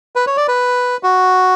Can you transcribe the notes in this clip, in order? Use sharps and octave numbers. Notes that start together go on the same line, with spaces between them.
B4
C#5
D5
B4
F#4